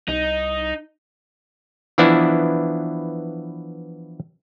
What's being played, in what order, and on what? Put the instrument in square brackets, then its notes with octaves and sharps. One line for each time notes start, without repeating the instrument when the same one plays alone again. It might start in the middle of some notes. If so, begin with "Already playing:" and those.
[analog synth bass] C2 [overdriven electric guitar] D#4
[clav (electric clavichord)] E3 F3 B3 D4 E4